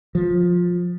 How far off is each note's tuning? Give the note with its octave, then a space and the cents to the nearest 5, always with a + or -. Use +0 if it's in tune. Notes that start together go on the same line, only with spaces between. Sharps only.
F3 +15